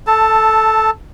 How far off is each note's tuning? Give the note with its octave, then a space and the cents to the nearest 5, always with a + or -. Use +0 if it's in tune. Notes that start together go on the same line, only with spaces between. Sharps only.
A4 -5 A5 +15